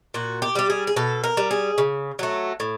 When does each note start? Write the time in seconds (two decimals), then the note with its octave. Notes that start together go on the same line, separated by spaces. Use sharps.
0.14 A#2 F#4
0.42 G4
0.55 G3 G4
0.70 G#4
0.87 G#4
0.96 B2 A4
1.24 A#4
1.37 G3
1.51 G#4
1.78 C#3
2.19 F#3 A3
2.60 A2